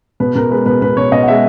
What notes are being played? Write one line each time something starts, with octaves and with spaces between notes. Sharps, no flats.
B2 B4
B2 A#4
G#3 B4
B2 B4
B2 B4
B2 C#5
B2 D#5
F#5
G#3 E5